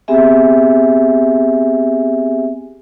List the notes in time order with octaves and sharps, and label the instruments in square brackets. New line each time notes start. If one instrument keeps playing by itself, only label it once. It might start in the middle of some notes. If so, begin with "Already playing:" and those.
[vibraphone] B3 C4 G4 G#4 E5 G#5